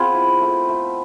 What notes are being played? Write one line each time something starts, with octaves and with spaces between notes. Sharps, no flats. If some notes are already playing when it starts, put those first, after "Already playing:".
Already playing: B3 C4 F4 G#4
E4
A3
A3